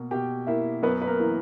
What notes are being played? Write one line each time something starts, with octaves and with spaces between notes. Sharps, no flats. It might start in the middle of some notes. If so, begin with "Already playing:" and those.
Already playing: B2 A#3
B2 G4 G5
A#3 E4 E5
F#2 B3 B4
B4
A#3 A#4
E3 A#3